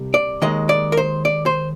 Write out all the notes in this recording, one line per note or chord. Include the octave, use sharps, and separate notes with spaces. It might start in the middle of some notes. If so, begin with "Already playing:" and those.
Already playing: C2 C3 G3
D5
D#2 D#3 G#3 D#5
D5
A#4
C5
D5
C5